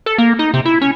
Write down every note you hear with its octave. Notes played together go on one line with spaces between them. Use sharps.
A4
A#3
D#4
C3
E4
C#4